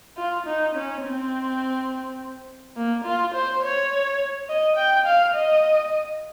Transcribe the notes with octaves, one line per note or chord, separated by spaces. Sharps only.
F4
D#4
C#4
C4
A#3
F4
C5
C#5
D#5
G5
F5
D#5